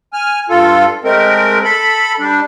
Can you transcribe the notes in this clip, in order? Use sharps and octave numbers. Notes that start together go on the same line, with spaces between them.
G#5 F6
G2 F4 A4
G#3 A3 C4 A#4
A4 B5
G3 D4